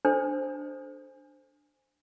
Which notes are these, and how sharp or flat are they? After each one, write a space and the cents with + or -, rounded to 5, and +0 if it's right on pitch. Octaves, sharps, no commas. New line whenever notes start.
D4 +0 A4 +0 C5 +0